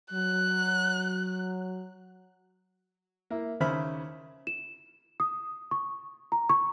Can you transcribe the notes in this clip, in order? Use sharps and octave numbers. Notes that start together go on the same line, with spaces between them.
F#3 F#6
A#3 E4
D#2 C#3 C5 E5 B5 F6
E7
D#6
C#6
A#5
C#6